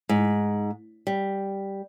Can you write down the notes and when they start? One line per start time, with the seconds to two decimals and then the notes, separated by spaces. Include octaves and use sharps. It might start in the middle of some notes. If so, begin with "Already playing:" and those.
0.09 G#2
1.07 G3